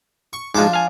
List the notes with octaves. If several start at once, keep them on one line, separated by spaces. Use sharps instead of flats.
C#6
G#2 F3 G#3 D4 D6
F5 G#5